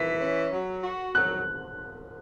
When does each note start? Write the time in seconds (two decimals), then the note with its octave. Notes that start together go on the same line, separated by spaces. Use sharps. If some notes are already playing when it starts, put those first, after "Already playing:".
Already playing: E3 B6
0.21 C#4
0.53 F#3
0.83 F#4
1.15 F#3 F#6